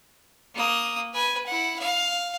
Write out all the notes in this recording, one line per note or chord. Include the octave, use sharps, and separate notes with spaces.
A#3 D#6
B4 G#5
E4 F#5
F5